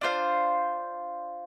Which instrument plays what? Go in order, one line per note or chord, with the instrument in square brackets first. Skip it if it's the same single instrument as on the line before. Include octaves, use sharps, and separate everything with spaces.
[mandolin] D4 F4 C5 F5